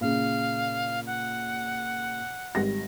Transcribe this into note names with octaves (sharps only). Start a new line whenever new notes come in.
A#2 C#3 F5
F#5
G#1 G3 A#6